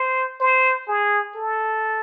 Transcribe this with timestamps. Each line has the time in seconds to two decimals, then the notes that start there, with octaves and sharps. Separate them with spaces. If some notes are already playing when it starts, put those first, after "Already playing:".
Already playing: C5
0.40 C5
0.88 G#4
1.36 A4